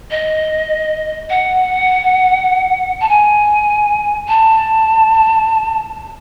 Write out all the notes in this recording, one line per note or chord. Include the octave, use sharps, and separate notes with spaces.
D#5
F#5
A5
G#5
A5